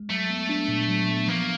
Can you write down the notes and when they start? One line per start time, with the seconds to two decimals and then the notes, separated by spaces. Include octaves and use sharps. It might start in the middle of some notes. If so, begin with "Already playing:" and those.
Already playing: G#3
0.10 F#3 A3
0.30 B3
0.49 D4
0.68 A#2
0.88 F#3
1.09 B3
1.28 F3 A#3